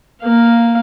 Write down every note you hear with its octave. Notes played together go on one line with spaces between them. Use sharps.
A#3 F5